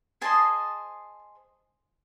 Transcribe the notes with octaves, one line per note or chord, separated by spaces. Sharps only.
G#4 C5 D#5 A5